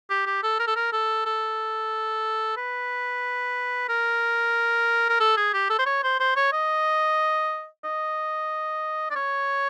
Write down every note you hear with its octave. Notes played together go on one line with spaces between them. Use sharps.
G4
G4
A4
A#4
A4
A#4
A4
A4
B4
A#4
A#4
A4
G#4
G4
A4
C5
C#5
C5
C5
C#5
D#5
D#5
D5
C#5